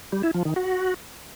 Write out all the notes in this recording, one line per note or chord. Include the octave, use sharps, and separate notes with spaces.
G3
E4
F3
D#3
F#4